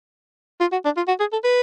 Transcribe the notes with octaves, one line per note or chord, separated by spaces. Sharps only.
F4
F#4
D4
F4
F#4
G#4
A4
B4